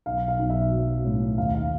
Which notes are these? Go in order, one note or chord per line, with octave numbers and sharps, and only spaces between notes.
B1 F5
F5
B1
E5
F#3
A2
D#2 F5
F5